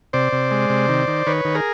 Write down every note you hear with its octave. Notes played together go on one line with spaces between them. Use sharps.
C3 C5 D5
C3
G#3
C3
D#3
D#3
D#3 B4 C#5
D#3
G#4 A#4